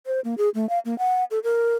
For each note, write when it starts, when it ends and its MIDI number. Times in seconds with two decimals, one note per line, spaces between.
0.06 0.20 72
0.24 0.35 58
0.38 0.49 68
0.55 0.69 57
0.69 0.79 77
0.85 0.97 58
0.99 1.24 78
1.31 1.39 69
1.44 1.75 70